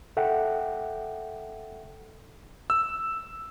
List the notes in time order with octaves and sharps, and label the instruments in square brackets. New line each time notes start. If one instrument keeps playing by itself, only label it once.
[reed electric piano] A4 E5 F#5 G5
[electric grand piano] E6